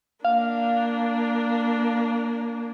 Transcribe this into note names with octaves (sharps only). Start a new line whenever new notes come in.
A#3 D4 F5